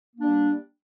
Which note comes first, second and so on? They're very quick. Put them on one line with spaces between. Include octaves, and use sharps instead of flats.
A#3 D4 G3